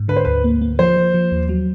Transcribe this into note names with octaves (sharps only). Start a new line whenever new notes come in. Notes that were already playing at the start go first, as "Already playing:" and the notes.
Already playing: G#2
D3 B4
C5
D2 B4
A#3
A#3
F3 C5
F3
F3
D#2
F#3